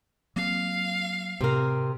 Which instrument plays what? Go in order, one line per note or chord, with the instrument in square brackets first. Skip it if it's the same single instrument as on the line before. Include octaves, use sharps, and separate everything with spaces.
[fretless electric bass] F#3 A#3 C4 [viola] F5
[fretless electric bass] A2 [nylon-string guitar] C3 A#4